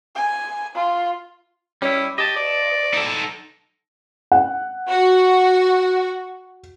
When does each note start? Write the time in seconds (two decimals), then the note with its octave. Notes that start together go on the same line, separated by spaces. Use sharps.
0.15 G#5
0.75 F4
1.82 G3 C#4 E4
2.18 G4 D#5 A5
2.36 D5
2.94 D#4 A4
4.32 F#5
4.89 F#4